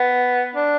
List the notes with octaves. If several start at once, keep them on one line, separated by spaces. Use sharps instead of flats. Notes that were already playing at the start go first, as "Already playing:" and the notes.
Already playing: B3
D4